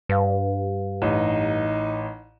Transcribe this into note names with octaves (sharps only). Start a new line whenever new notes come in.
G2 B4 F5
A1 D#4